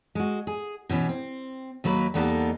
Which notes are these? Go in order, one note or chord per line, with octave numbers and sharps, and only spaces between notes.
G#3 F#4
G#4
B2 E3 C#4
C4
D#2 F#3 A#3 B4
E2 G3 A#3 B3 D#4 A4